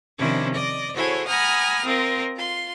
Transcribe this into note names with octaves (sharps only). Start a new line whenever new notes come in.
C3 D#3 F3 C#4 D4 E4
D5 D#5
E4 F#4 G#4 A4 C5 C#5
F#5 G#5 A#5 B5 D#6 F6
C4 F4 A#4 D#5
F4 C6